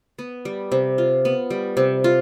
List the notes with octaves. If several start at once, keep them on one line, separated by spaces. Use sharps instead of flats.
B3
G3
C3
F4
B3
G3
C3
F4